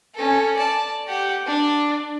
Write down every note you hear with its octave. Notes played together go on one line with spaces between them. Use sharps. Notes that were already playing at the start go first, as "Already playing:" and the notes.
C#4 A4
D5 A5
G4 F#5
D4